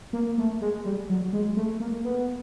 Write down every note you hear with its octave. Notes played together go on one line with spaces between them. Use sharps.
A#3
A3
G#3
G3
F#3
G#3
A3
A#3
B3